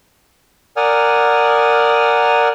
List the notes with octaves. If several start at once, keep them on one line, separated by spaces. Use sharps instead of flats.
A#4 D5 F#5 G#5 D#6 F6